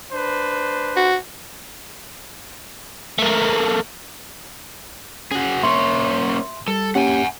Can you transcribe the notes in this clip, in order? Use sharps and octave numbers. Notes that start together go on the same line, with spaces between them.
D4 B4 C5
F#4
A3 A#3
C#4 F#4 G#4
A#3 C#4 C#5 E5 C6
G3 A4
A#3 C#4 G4 F#5 G#5